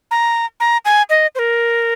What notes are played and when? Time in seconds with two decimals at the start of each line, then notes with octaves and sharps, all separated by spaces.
0.11 A#5
0.60 A#5
0.85 G#5
1.10 D#5
1.35 C5
1.39 A#4